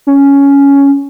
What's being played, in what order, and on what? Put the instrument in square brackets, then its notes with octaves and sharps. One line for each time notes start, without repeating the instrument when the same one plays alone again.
[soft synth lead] C#4